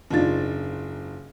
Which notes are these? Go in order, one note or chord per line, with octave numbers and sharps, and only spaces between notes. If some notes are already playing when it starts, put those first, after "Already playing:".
F#1 G#2 D4 F4 A6